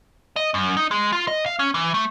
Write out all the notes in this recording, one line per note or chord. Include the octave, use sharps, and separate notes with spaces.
D#5
F#2
D#4
G#3
F4
D#5
F5
C#4
E3
A3